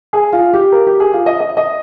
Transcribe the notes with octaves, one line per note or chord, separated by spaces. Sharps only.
G#4
F4
G4
A#4
G4
G#4
F4
D#5
D#5
D#5